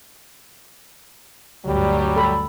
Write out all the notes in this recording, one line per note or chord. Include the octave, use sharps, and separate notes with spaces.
D2 G2 F#3 G3
A4 B5